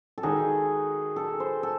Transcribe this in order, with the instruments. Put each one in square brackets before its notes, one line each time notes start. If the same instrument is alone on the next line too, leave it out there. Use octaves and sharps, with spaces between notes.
[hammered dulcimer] A4
[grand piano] D#3 G#3 D#4 F#4 [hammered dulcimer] G#4
[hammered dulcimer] A4
C5
A4